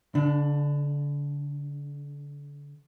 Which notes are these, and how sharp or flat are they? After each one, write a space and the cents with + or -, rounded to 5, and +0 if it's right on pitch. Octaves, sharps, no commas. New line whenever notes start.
D3 -35 D4 +15